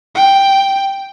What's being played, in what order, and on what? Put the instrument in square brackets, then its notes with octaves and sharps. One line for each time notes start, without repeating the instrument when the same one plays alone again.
[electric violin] G5